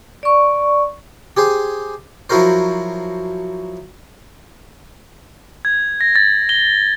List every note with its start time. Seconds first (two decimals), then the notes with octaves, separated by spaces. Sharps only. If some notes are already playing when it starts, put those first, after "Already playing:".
0.23 D5 C#6
1.37 G4 G#4 C5
2.30 F3 F#3 E4 F#4 A#4 C5
5.65 G#6
6.01 A#6
6.16 A6
6.49 G7